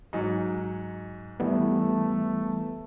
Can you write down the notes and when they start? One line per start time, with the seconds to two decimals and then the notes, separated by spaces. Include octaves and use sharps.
0.13 G#2 F#3
1.40 E3 G3 A3 B3